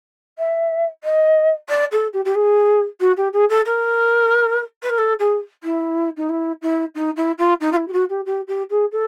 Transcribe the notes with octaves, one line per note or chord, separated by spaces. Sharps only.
E5
D#5
D5
A4
G4
G4
G#4
F#4
G4
G#4
A4
A#4
B4
A#4
A4
G#4
E4
D#4
E4
E4
D#4
E4
F4
D#4
F4
E4
G4
F#4
G4
G4
G4
G#4
A4